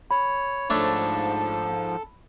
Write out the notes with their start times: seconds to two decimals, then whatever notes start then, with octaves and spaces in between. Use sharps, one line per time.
0.11 C#5 B5
0.70 G#2 F3 A3 D4 A4 C#5